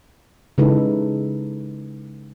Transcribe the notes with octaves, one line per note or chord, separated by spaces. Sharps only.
C#3 G#3 D#4 E4 A4 B4